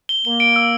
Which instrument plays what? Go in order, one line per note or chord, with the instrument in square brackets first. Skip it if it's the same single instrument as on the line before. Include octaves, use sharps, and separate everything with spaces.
[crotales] G7
[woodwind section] A#3 [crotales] G7
[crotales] D7
E6